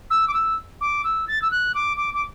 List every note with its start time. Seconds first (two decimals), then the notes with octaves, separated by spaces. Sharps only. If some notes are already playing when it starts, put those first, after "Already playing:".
0.10 E6
0.28 D6
0.34 E6
0.81 D6
1.04 E6
1.28 A6
1.42 E6
1.51 F#6
1.74 D6
1.97 D6
2.14 D6